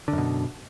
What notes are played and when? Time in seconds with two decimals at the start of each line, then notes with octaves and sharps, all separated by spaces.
0.08 D3
0.13 F#2
0.18 B2